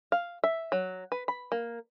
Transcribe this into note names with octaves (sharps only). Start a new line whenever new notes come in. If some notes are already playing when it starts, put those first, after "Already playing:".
F5
E5
F#3
B4
B5
A#3